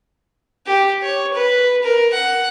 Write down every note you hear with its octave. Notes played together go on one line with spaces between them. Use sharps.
G4
C#5
B4
A#4
F#5